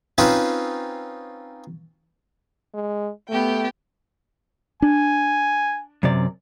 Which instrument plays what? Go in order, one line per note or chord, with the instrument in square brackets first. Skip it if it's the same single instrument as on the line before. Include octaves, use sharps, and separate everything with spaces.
[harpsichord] C4 C#4 D#4 F4 B4 C5
[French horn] G#3
[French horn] A3 [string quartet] B3 G4 G5
[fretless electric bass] D4 [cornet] G#5
[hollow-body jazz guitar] F#2 C3 D5